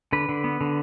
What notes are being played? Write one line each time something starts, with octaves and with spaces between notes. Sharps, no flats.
D3 B4
D3
B3
D3